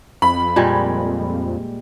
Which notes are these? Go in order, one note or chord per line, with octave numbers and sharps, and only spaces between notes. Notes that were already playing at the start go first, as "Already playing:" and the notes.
F2 B5
A#2 G3 G#3